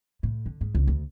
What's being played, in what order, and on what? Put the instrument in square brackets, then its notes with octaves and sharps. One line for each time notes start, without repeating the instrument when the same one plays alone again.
[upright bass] A2
D3
G#2
C#2
D2